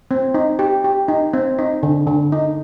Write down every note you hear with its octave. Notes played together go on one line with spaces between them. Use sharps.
C4
D#4
G4
G4
D#4
C4
D#4
D3
D3
D#4